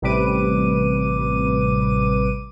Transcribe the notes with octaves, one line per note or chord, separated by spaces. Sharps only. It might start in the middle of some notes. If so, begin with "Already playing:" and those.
A1 C3 G3 B4 D6 D#7